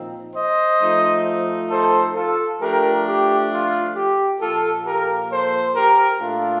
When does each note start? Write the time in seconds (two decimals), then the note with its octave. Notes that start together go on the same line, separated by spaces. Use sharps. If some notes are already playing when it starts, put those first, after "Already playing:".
Already playing: A#2 F3 C4 D#4
0.35 C5 D#5
0.80 F3 A3 D#4
1.70 A4 C5
2.15 F4 A4
2.60 F3 A3 D4 G4 A#4
3.06 G4
3.51 F4
3.95 G4
4.40 A#2 F3 A#3 F4 A4
4.85 G4 A#4
5.31 A4 C5
5.75 G4 A#4
6.20 A#2 A3 D4 F4 A4